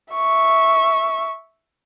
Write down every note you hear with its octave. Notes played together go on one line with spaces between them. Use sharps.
E5 C#6